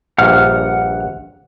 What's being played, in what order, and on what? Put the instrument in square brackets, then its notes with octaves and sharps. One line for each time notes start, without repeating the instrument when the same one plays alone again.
[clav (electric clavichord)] A#1 G2 A#2 [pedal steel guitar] F#5 F6